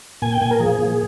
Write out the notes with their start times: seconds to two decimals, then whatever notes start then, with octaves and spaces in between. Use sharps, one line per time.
0.22 A#2 G#5
0.32 G5
0.41 A#2 G#5
0.51 A#4
0.60 F3 G#4
0.79 A#2